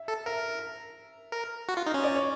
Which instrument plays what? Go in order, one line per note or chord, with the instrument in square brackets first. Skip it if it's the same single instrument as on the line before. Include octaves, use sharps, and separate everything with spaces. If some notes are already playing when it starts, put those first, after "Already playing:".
Already playing: [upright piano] E5
[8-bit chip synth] A4
[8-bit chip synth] A#4 [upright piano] E5
[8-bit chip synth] A#4
F#4
F4
D#4
C#4
[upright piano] D5
C#5